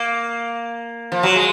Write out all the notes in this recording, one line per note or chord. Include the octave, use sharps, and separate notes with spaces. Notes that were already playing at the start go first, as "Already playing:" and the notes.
Already playing: A#3
F3
F#3
G#3